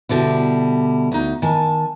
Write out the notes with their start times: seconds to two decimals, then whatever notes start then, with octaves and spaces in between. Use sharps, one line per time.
0.09 B2 D3 G3 E4
1.12 D2 D#4
1.42 D#3 G#5 A5